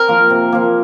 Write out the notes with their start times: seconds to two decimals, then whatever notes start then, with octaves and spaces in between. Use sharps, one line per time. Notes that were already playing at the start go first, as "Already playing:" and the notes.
Already playing: C4 A#4
0.08 F3 A#3
0.30 C3
0.52 F3 A#3